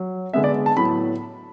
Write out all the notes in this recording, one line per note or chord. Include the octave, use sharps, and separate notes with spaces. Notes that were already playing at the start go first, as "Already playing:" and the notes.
Already playing: F#3
D3 G#3 B3 E5
D5
A5
A2 F#3 B3 B5